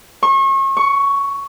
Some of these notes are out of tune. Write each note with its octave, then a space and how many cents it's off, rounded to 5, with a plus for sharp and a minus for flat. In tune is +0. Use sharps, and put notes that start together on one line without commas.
C#6 -35
C#6 +10